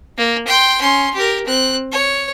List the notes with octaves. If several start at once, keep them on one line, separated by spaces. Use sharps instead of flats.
A#3
G5 C6
C#4 C6
G4 A#4
C4 F#6
C#5